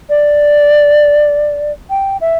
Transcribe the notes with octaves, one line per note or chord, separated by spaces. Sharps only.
D5
G5
E5